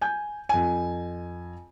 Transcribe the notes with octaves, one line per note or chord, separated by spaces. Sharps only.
G#5 G6
F2 G#5